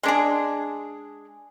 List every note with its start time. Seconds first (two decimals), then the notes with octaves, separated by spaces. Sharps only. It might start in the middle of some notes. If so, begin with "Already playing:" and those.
0.03 G#3 D4 G#4